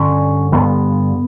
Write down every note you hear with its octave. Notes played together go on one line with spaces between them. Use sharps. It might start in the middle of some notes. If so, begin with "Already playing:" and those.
Already playing: G2 D3 C#4
G2 D3 B3